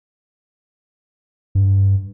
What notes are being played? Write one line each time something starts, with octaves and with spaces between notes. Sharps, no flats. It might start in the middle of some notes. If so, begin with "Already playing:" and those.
G2